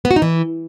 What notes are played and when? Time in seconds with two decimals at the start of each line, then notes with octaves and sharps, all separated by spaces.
0.05 B3
0.11 F#4
0.16 D#4
0.22 E3